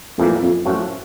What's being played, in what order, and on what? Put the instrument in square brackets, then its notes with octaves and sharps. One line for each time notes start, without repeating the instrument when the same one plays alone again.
[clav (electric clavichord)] A#1 A2 E3 G3 A#3 [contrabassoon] F2
[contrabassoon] F2
[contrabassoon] F#2 [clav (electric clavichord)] A2 F3 A3 C#4 F#4